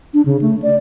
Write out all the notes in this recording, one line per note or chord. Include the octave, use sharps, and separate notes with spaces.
D4
C#3
A3
D5